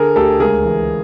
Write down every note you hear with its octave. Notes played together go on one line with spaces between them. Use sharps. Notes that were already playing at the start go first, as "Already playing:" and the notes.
Already playing: D3 G#4 A#4
D2 G4 A4
C#2 G#4 A#4
E3